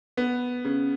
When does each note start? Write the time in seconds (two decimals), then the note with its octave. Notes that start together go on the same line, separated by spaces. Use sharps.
0.17 B3
0.65 C#3